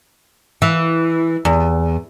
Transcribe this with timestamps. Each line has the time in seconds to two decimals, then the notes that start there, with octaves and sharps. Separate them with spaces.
0.62 E3
1.45 E2